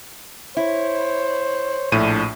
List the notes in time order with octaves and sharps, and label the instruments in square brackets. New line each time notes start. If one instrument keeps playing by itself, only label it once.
[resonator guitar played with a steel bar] E4 [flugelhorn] C5 [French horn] C#5
[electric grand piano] A#1 A2 D#7 [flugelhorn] D4